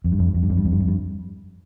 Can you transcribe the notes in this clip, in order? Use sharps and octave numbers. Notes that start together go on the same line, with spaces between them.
F2
G2
F2
G2
F2
G2
F2
G2
F2
G2
F2
G2